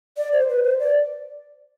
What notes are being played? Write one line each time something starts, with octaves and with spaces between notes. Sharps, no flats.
D5
C5
B4
C5
D5